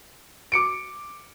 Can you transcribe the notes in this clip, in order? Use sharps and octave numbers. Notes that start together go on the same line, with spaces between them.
D6 C#7 D7